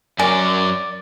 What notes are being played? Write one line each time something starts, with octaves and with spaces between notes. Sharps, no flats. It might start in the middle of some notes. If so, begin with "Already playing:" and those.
F#2 F#3 A#4 D5 G#5 D6